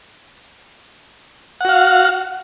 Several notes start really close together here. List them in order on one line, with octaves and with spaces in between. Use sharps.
F#5 F#4 F5